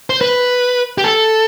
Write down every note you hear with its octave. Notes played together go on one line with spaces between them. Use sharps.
C5
B4
G4
A4